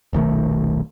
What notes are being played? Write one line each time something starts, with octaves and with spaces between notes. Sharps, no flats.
D#1 B1 D#3 A3